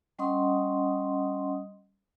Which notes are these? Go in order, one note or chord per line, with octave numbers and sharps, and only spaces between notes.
G3 C#4 D#5 F#5 C6 D#6